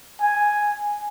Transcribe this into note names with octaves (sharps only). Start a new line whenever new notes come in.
G#5